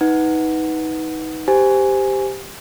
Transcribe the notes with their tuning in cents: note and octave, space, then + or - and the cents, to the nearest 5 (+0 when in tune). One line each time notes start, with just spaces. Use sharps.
D#4 +25 B4 +0 F#5 +0
G4 +0 C5 -20 G#5 +0